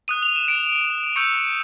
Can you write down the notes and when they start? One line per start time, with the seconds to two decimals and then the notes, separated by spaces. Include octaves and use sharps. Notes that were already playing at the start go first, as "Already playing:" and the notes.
0.08 D#6 F#6 D#7
0.23 F7
0.36 E7
0.48 D7
1.16 C#6 E6 G6 C#7